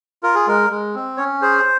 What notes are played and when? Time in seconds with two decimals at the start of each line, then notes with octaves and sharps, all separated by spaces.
0.23 F4 A#4
0.35 G#4
0.47 G#3 A#4
0.70 G#3
0.95 C4
1.17 C#4 C#5
1.42 G#4 C5